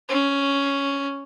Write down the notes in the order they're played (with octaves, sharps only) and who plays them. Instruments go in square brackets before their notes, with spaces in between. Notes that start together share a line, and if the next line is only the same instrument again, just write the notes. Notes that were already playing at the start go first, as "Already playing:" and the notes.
[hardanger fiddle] C#4